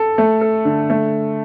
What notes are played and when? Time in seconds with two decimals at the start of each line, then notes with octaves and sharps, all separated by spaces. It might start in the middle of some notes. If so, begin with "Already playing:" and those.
Already playing: A4
0.18 A3
0.41 A4
0.65 D3
0.90 A3